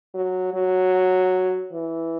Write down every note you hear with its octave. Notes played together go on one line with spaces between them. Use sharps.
F#3
F#3
E3